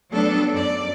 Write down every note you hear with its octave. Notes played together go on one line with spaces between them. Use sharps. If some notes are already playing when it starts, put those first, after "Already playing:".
F#3 G3 A3 B3 D4 A4
F#2 D5